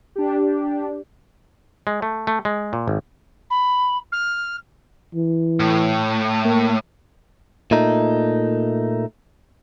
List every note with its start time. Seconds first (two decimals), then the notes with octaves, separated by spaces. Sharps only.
0.16 D4 G4
1.87 G#3
2.02 A3
2.27 A3
2.45 G#3
2.73 A#2
2.88 G#1
3.50 B5
4.12 F6
5.15 E3
5.60 A2
6.45 A#3
7.71 A#2 A3 D#4